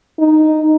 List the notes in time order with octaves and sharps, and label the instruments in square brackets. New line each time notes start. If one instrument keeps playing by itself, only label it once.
[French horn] D#4